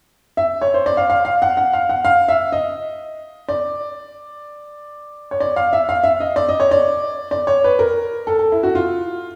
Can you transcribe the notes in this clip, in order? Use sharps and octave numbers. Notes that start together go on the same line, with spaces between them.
E5
C#5
C5
D5
F5
F5
F5
F#5
F#5
F5
F#5
F5
E5
D#5
D5
C#5
D5
F5
E5
F5
E5
D#5
D5
D#5
C#5
D5
D5
C#5
B4
A#4
A4
A4
E4
F#4
F4